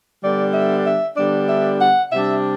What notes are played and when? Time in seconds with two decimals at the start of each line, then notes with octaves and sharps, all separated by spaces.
0.23 D3 G3 B3 D4 D5
0.54 E5
0.85 E5
1.17 D3 G3 B3 D4 D5
1.49 E5
1.80 F#5
2.12 C3 G3 D4 E5